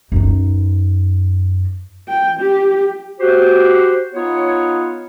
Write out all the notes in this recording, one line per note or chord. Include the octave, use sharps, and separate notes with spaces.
F#2 D#4
G5
G4
F#4 G4 C5
B3 D#4 F4 C#5